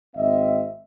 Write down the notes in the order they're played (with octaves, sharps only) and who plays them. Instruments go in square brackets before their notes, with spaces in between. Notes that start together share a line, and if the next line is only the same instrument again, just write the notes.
[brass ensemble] G#1 C4 D#5 E5